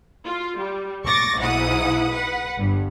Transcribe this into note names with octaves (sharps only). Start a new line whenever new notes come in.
F4
G3
C#6 D6 A6 A#6
B1 G#2 E4 F#5 D#6
B4 F#5
G1 G2